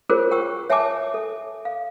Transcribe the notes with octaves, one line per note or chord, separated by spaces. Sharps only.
F4 F#4 G#4 A#4 C5 C#5
F#5 G5 C#6 E6
C#5 E5 F#5 G#5 A5 D6
A4 E5
F5